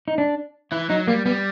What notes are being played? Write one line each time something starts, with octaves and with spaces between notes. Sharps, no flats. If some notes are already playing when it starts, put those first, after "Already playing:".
D#4
D4
E3 E4
F#3 D#4
G3 A#3
G3 B3